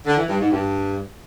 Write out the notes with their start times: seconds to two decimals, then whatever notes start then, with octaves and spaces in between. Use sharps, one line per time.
0.06 D3
0.17 E3
0.29 G2
0.40 G#2
0.51 G2